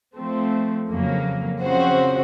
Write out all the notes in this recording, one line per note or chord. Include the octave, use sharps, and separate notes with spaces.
F3 A3 C4
F2 C#3 F#3 A#3
C#3 F3 C4 F#4 C5